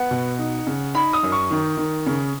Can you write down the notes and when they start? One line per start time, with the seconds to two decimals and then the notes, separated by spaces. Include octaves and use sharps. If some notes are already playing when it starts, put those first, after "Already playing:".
Already playing: B3 F#5
0.11 B2
0.39 D#4
0.67 C#3
0.94 D#4 B5
1.13 D#6
1.23 F#2
1.32 C#6
1.51 D#3
1.77 D#3
2.06 C#3